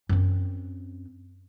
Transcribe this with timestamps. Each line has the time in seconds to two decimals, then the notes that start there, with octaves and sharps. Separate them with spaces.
0.09 F#2 C4